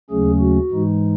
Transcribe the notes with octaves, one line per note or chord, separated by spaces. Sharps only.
D#2 C#3 F#3 A3 C#4 G#4
F#4
G#2 E3 G#3 D#4